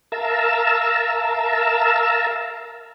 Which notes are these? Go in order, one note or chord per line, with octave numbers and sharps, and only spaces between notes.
A#4 E5 F5 A5 A#5 E6